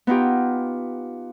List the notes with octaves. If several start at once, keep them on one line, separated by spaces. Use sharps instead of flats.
B3 D#4 F4 G4